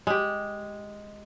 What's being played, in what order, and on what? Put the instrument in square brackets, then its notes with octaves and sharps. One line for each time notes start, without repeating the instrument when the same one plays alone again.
[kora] G#3 G4